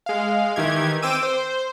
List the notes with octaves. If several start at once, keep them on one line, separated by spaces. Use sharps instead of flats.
G#3 F5
D#3 E3 G4 G#6
C4 G5 D6 E6 D#7
C5